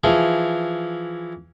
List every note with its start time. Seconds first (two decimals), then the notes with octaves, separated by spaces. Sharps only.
0.04 E3 F3 G#4